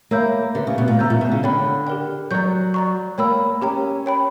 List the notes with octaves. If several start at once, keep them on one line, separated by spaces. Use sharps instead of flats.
A#3 C#5 E5 B5 E6 G6
D3 G4 B4 E5
C#3
B2
A#2
C#3 E5 A#5 E6 G6
A#2
B2
C#3
D3 C#5 G5 B5
G4 A#4 D5 G5
F#3 D5 A#5 C#6 G6
D5 A#5 C#6
A#3 C#5 G5 B5 E6
C#4 G4 A#4 C#5 G5 A#5
C#5 G5 B5